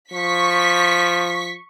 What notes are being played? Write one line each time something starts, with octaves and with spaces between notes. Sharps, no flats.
F3 C#6 B6